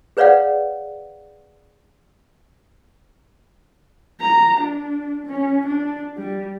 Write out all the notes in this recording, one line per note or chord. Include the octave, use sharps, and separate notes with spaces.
G#4 B4 C#5 D5 F5 F#5
A#5
D4
C#4
D4
G3